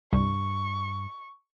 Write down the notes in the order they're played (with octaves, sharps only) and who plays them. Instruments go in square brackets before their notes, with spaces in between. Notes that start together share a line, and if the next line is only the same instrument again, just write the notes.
[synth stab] C2 [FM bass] G2 [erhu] C#6